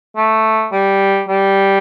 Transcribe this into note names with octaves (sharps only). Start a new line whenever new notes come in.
A3
G3
G3